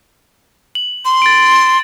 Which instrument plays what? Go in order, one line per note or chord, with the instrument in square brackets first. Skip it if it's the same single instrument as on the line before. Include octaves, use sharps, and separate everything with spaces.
[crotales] F#7
[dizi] C6
[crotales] A6 D7